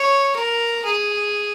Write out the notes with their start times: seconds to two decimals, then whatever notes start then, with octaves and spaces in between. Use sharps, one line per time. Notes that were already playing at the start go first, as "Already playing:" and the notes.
Already playing: C#5
0.36 A#4
0.85 G#4